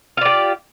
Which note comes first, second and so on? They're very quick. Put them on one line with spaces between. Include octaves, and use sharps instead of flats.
F4 D5 G4